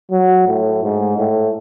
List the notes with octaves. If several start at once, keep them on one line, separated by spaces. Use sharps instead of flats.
F#3
A2
G#2
A2